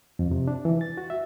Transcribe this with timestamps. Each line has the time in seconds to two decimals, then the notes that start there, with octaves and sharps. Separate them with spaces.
0.19 F2
0.31 C3
0.48 D4
0.65 E3
0.81 A6
0.97 F#4
1.10 E5